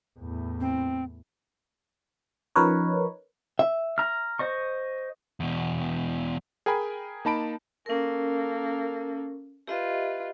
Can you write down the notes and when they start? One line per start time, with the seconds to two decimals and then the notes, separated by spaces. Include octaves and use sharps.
0.19 E2 A2
0.60 C4
2.56 F3 C#4 D#4 A#4 B4 C#5
3.59 E5
3.98 A#5 F6
4.39 C5 D#5 C#6
5.40 E2 B2
6.66 G#4 A#4 G5 G#5 B5
7.25 A#3 D#4 A5 B5 D7
7.86 A#3 C#4 A4 A#4
9.67 F4 G4 B4 D#5 E5